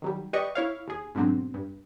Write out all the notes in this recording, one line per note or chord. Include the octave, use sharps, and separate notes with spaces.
D#3 F#3 G3
G4 B4 D5 D#5 C#6
E4 C#5 F5
D#2 G#4
G#2 B2 D3 F#3 C4
G2